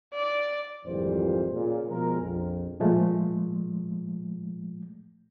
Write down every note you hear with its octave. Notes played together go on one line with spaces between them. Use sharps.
D5
G#1 F2 A#2 E3 G3 C5
A#2 C#3
B2 F3 G#3 A#4
A#1 F2
A#2 F3 G#3 A3